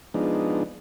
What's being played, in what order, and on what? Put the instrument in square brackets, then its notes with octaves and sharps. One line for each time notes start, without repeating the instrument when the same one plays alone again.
[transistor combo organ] F3 G#3 B3 D4 D#4